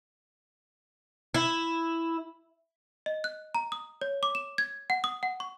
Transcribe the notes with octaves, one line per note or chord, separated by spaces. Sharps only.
E4
D#5
F#6
A#5
D#6
C#5
D6
E7
G#6
F#5
D#6
F#5
C#6